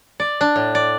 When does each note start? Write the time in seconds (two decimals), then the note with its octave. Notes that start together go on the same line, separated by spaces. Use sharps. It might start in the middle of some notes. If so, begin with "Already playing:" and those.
0.20 D5
0.41 D4
0.56 A2
0.75 D5